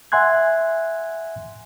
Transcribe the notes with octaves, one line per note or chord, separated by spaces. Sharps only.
E5 F#5 G#5 C6 F#6 G#6